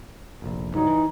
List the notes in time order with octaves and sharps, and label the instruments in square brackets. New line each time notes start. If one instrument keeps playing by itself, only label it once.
[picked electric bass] F1 A#1
[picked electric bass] C#2 G2 F#3 [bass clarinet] D#4
[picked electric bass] E3